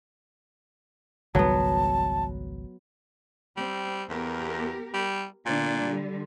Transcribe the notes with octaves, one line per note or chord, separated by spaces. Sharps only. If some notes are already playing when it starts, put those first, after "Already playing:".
G#1 C#2 F#3 G3 B3 A5
G3 C4
E2 B3 G4 A#4
G3
A#2 D3 B3 D4
D3 G3